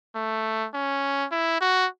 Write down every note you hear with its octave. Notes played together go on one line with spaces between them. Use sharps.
A3
C#4
E4
F#4